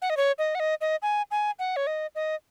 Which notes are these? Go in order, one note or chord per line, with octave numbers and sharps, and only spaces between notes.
F#5
D#5
C#5
D#5
F#5
D#5
D#5
G#5
G#5
F#5
C#5
D#5
D#5